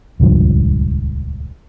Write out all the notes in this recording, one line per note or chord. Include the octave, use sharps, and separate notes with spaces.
D#1 C#2 G2 F3